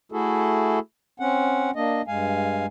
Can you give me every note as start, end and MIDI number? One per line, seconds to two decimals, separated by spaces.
0.12 0.79 57
0.12 0.79 64
0.12 0.79 66
0.12 0.79 68
0.12 0.79 69
1.20 1.71 60
1.20 1.71 61
1.20 1.71 78
1.76 2.02 58
1.76 2.02 62
1.76 2.02 75
2.07 2.66 43
2.07 2.66 56
2.07 2.66 77
2.07 2.66 80